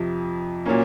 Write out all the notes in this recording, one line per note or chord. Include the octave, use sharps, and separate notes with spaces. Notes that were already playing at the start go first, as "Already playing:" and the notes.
Already playing: F2 C3 F3
A#2 F#3 A#3 C#4